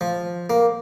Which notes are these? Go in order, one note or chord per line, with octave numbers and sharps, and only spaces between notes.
F3
A#3